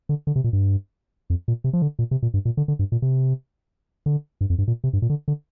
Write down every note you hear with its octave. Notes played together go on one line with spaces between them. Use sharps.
D3
D3
C3
A#2
G2
F2
A#2
C3
F3
D3
A#2
C3
A#2
G2
A#2
D3
D3
G2
A#2
C3
D3
G2
F2
G2
A#2
C3
G2
A#2
D3
D3